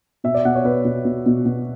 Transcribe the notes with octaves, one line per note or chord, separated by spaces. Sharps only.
B2 E5
D5
B2 F#5
C#5
B2 B4
B2
B2
B2
B2